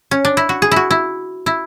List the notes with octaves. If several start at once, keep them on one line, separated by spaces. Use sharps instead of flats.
C#4
D4
E4
F#4
G#4
E4 F#4
E4
E4